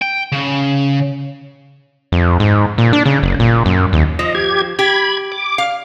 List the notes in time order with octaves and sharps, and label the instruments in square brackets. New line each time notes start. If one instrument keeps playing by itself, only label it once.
[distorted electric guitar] G5
C#3
[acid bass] F2
G#2
A#2
D4
C#3
F#1
A#2
F#2
D#2
[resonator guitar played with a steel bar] F3 [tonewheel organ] D#5
[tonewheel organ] G4 G#6
[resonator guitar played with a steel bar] G4 [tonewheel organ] B5 G#6
[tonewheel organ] D6
[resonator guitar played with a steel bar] F5